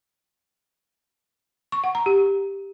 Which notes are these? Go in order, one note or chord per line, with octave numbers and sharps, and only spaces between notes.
C#6
F#5
A#5
G4